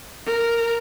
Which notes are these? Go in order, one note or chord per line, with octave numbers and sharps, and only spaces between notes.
A#4